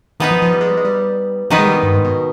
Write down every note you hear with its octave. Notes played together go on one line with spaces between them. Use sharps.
D#3 B3 D#4 B4
F3
F3
G3
G#3
G3
G#3
G3
D#3 F3 B3 D#4 B4
G#3
G3
B2
G2
G#2
B2